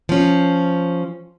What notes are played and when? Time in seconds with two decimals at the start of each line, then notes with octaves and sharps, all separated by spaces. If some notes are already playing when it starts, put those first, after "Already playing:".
0.09 F3 C#4